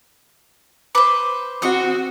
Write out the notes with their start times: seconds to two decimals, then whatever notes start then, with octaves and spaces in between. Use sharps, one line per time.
0.95 B4 C5 D6
1.62 C4 F#4 D#5 C#6